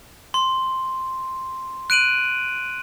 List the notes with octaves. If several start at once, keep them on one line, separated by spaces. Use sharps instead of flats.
C6
F#6 D7 D#7 F#7